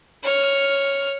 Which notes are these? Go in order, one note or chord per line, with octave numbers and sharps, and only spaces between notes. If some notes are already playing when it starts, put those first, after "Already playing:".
C#5 F6